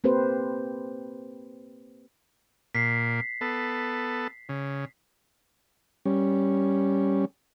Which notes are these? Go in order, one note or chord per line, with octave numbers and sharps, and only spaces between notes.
A#3 C4 G4 B4 C5
A#2 B6 C7
B3 A4
C#3
G3 C#4